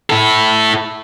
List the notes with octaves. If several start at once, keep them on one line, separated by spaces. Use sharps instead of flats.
E4 A4